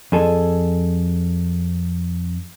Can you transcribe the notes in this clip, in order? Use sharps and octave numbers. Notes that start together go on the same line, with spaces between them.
F2 G#4 A4